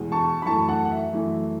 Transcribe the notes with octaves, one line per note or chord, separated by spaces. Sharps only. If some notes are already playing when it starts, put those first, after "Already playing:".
Already playing: E2 B2 G#3
A5 C#6
B5
F#2 E3 A3 A5 C#6
F#5 A5
F#5
E5
F#2 E3 A3